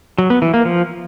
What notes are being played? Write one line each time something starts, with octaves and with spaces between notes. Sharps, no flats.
F#3
B3
E3
A#3
F3